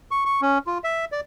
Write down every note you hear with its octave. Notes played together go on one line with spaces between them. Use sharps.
C#6
C#6
C#4
F4
E5
D5